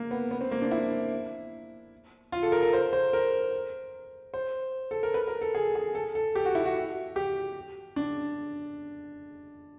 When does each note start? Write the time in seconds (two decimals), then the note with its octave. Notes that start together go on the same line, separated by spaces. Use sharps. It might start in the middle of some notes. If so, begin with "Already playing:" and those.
Already playing: A#3
0.11 B3
0.31 B3
0.41 C4
0.51 A#3
0.62 D4
0.71 E4
2.32 F4
2.43 A4
2.52 A#4
2.62 A#4
2.73 C5
2.93 C5
3.13 A#4
4.34 C5
4.91 A4
5.03 A#4
5.14 B4
5.27 A#4
5.41 A4
5.55 G#4
5.75 G#4
5.95 A4
6.15 A4
6.35 G4
6.45 F#4
6.55 E4
6.65 F#4
7.16 G4
7.96 D4